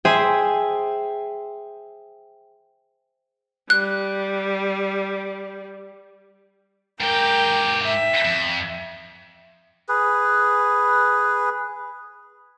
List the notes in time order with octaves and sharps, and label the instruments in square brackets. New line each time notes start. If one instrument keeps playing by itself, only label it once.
[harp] G#4 C5 E5 G5 G#5
[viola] G3 [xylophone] F#6
[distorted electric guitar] G#2 G4 [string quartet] A#4 G5
[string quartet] E5
[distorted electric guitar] F2
[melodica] G#4 B4